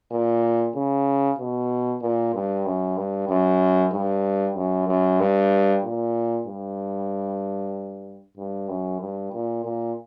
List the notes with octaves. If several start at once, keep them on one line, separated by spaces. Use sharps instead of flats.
A#2
C#3
B2
A#2
G2
F#2
G2
F#2
G2
F#2
F#2
G2
A#2
G2
G2
F#2
G2
A#2
A#2